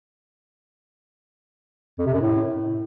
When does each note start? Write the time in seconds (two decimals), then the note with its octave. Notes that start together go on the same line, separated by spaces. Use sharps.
1.99 F2
2.06 C3
2.14 F#2
2.21 A2